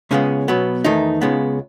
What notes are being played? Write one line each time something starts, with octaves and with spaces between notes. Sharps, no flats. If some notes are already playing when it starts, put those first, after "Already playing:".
C#2 C#3 G#3 B3 C#4
B2 F#3 B3
E2 D#3 A3 D#4
C#2 C#3 G#3 B3